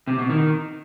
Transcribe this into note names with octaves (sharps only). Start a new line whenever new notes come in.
C3
B2
D#3